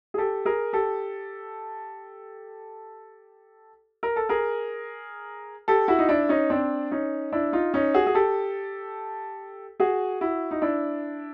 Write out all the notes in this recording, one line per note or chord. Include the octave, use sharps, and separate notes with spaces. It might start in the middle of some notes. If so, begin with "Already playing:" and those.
G#4
G4 A4
G#4 A#4
G4 A4
A#4
A4
G#4 A#4
G4 A4
E4 F#4
D#4
D4 E4
C#4 D#4
C4 D4
C#4 D#4
D4 E4
D#4 F4
C#4 D#4
F#4 G#4
G#4
G4 A4
F#4 G#4
E4 F#4
D#4
D4 E4